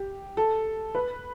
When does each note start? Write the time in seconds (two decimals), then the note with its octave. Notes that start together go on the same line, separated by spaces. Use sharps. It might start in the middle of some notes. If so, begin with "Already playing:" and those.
Already playing: G4
0.37 A4
0.95 B4